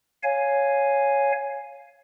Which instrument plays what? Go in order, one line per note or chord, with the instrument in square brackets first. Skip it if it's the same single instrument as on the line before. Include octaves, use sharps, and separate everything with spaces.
[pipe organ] C#5 F5 G#5